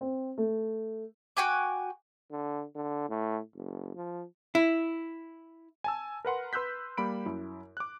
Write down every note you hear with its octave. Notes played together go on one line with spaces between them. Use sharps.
C4
A3
F#4 G5 G#5 D6
D3
D3
A2
F#1
F3
E4
G#5 A5 E6
A#4 B4 F#5 C6
B4 C6 E6 F#6 G6 B6
G3 A#3 B5 D7
F#2 E4
D6 F#6